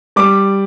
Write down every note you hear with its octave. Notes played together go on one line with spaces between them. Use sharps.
G3 D6